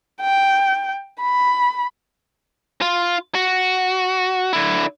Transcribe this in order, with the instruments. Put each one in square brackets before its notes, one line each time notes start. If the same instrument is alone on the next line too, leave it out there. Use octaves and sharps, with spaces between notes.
[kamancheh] G5
B5
[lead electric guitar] F4
F#4
D3 E4